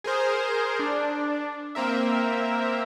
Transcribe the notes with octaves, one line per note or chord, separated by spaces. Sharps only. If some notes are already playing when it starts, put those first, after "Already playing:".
G#4 A#4 C5
D4
A#3 C4 A#4 E5